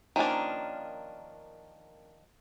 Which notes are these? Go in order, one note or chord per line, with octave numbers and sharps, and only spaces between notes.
D#3 F3 A#3 C#4 D4